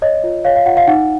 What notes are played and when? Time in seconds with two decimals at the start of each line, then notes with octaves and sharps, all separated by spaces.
0.02 C#5 D#5
0.24 F4
0.45 C#5 F5
0.56 F5
0.66 F4 F#5
0.77 F5
0.87 D#4 F#5